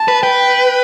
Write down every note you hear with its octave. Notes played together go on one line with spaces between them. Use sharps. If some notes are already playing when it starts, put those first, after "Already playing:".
Already playing: A5
B4
B4 G5